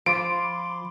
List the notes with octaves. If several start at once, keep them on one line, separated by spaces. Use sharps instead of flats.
F3 F4 C5 B5 C6 D6 D7